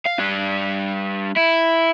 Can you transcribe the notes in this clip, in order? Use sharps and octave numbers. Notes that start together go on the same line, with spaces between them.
F5
G3 D4
E4